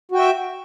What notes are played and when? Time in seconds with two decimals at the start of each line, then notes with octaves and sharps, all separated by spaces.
0.12 F#4
0.15 G5
0.19 E5